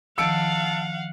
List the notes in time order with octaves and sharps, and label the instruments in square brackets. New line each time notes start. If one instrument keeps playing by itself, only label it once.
[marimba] D#3 F3 [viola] F5 F#5 [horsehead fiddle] A5 [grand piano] E6 C#7 D7